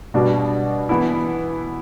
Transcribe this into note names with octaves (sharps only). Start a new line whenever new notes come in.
B2 G3 D4 F#4
E3 B3 E4